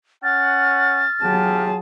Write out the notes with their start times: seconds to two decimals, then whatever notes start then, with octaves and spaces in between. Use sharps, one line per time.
0.24 C#4 F#5 F6 A6
1.23 F#3 F4 G4 G#4 A5